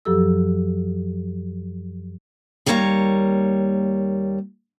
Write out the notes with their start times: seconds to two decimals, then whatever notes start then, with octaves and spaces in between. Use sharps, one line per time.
0.05 F#2 F3 F#3 G4 A4 E6
2.66 D#2 G3 A#3 C#5 E5 A#5